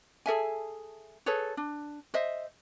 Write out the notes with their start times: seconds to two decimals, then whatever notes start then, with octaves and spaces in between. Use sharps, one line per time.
0.26 G#4 A4 E5 G#5
1.26 G#4 A4 B4 C#5
1.57 D4
2.14 C5 D#5 E5